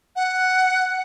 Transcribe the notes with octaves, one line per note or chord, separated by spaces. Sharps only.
F#5